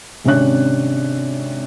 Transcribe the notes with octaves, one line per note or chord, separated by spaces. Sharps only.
G#1 C3 C#4 D4 C#5 F#6